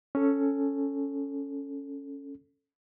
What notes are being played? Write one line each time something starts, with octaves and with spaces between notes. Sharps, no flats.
C#4 A4